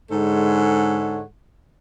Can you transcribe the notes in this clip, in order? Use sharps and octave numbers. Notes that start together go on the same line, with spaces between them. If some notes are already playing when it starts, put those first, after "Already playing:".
G#2 D3 G#3 A4 C#5 F#5